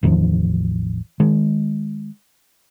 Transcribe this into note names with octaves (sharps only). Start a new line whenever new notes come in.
A1 E2 D#3 F3
D#3 G#3